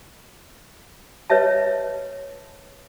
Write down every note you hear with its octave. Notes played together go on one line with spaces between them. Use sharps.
B4 C#5 D#5 E5 A5